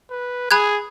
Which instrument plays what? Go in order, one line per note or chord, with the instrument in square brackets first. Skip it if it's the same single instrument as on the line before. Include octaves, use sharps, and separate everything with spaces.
[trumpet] B4
[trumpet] G#4 [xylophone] B5 F#6 G#6